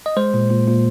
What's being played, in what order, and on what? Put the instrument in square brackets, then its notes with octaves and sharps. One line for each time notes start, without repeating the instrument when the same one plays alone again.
[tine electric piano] D#5
G#3 C5
A#2
A#2
A#2